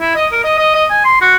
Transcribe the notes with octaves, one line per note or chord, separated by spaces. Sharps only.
E4
D#5
A#4
D#5
D#5
D#5
G#5
C6
F#4